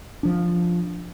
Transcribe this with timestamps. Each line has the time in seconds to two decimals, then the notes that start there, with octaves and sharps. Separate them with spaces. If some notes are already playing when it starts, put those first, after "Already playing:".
0.23 F3 D4